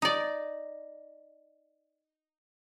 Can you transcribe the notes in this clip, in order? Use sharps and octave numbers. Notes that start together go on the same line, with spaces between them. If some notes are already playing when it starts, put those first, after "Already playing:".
D#4 D5